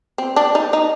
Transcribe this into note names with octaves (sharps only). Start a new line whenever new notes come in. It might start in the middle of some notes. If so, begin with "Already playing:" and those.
C4
D4
D#4
D#4